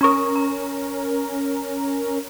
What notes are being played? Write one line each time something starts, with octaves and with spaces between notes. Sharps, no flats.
C#4 A#4 A#5 C#6 D#6
A#5